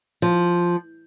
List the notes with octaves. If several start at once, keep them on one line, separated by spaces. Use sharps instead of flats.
F3